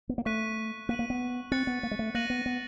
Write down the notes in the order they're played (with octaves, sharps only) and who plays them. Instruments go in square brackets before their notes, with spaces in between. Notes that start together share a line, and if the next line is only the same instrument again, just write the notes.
[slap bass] B3
A#3
[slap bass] A3 [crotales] C#6 F#6 B6 D#7
[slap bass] A#3 [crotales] F#6 B6 D#7 F#7
[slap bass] A#3
B3
[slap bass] C4 [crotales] F#6 A6 C#7
[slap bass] B3
A#3
G#3
A3
[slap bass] A#3 [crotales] F#6 A#6 D#7 F#7
[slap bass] B3
B3